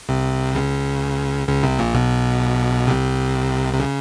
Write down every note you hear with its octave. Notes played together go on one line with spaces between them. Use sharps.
C2 C3
C#2 C#3
C#2 C#3
C2 C3
A#1 A#2
B1 B2
C2 C3
C3
C#3